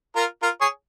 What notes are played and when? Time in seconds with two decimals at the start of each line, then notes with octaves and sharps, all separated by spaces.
0.16 F4 A#4
0.42 F4 A#4
0.61 G#4 C#5